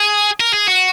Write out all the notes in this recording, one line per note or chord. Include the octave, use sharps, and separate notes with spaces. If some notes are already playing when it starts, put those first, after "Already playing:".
Already playing: G#4
A#4
G#4
F#4